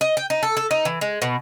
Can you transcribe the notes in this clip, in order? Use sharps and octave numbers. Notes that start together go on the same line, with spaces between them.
D#5
G5
D#4
A4
A4
D#4
E3
G#3
B2